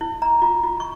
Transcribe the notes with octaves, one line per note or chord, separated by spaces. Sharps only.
E4
A#5
F4
F4
C#6